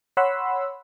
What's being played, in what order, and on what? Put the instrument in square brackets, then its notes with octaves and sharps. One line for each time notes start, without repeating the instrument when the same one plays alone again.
[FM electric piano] C#5 F#5 B5 C6 E6